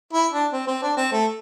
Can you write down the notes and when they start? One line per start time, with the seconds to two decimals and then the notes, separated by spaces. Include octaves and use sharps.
0.13 E4
0.33 D4
0.53 C4
0.67 C4
0.82 D4
0.97 C4
1.12 A3